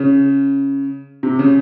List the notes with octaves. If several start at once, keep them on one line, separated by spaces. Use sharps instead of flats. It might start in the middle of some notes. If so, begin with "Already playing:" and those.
Already playing: C#3
C3
C#3